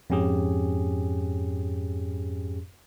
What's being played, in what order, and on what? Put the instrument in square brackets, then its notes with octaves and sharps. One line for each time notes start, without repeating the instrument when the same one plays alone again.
[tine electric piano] F2 G#2 C#4 G4 G#4